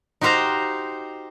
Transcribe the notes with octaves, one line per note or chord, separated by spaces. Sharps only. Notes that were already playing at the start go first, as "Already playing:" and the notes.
D#4 F#4 G4 C5 F5 A#5